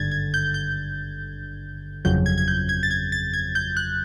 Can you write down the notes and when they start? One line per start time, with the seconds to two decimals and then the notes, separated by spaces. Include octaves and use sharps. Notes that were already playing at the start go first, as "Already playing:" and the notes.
Already playing: G#1 G2 D3 G#6 A6
0.12 G#6
0.34 G6
0.54 G6
2.05 G1 F2 C#3 F#3 G6
2.26 G#6
2.38 G#6
2.48 G6
2.69 G#6
2.83 A6
2.91 G#6
3.12 A6
3.33 G#6
3.55 G6
3.77 F#6